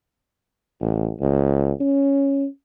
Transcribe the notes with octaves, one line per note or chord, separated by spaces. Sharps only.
A1
C#2
C#4